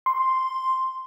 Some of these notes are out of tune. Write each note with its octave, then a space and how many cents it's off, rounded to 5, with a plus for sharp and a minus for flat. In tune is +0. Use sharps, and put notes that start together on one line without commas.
C6 +0